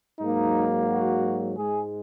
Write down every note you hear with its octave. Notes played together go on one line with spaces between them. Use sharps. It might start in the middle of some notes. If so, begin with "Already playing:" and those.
G#2 F#3 A#3 D#4
F#4
G#2 G#3 G#4